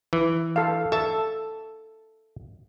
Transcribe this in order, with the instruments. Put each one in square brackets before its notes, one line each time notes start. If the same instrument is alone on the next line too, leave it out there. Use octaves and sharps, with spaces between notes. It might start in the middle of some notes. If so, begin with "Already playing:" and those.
[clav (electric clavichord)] E3
[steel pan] A4 F5
[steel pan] A4 [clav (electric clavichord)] E5 A5